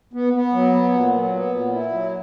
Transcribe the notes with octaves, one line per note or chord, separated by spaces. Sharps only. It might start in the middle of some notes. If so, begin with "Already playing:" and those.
B3
B3
F#3
B3
A#2
F#3
B3
A#2
E4
F#3